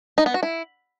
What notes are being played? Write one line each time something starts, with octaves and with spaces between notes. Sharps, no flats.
D#4
B3
F#4
E4